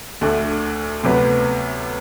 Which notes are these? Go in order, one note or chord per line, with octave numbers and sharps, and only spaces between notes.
D2 D3 A3 D4
D2 C3 F#3 B3